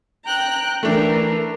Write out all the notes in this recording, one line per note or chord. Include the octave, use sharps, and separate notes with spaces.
G5 A#5 F#6
E3 A3 D4 A#4